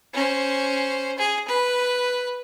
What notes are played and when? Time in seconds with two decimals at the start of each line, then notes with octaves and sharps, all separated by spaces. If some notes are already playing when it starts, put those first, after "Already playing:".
0.14 C#4 C5
1.18 G#4
1.47 B4